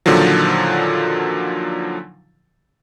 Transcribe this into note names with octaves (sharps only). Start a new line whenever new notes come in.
A#2 D3 D#3 F3 F#3